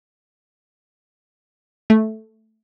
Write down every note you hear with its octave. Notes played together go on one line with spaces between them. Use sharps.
A3